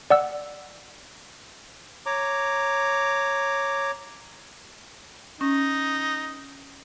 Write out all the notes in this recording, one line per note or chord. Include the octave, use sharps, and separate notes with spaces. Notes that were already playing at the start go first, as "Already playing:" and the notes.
D5 F#5 E6
C#5 A#5 D6
C#4 D#4